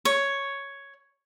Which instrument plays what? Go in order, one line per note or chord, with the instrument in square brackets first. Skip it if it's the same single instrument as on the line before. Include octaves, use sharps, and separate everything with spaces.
[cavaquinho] C#5